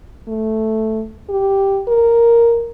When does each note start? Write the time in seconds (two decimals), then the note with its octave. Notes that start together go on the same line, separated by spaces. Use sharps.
0.28 A3
1.29 G4
1.88 A#4